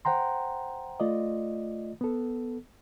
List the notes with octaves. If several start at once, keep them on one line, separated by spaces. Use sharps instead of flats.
C5 F#5 G5 A#5 C6
A3 F4 D5 D#5
B3 A4